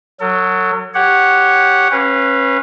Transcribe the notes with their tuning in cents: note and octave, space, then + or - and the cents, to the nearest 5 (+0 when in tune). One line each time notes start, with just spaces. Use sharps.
F#3 +0 A4 +45
G4 +0 C#5 +0 F#5 +0
C#4 -30 B4 -15 F5 +0